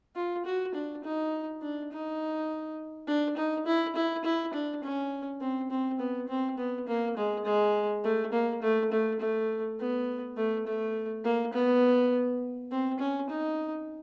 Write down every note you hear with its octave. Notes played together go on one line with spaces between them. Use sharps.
F4
F#4
D4
D#4
D4
D#4
D4
D#4
E4
E4
E4
D4
C#4
C4
C4
B3
C4
B3
A#3
G#3
G#3
A3
A#3
A3
A3
A3
B3
A3
A3
A#3
B3
C4
C#4
D#4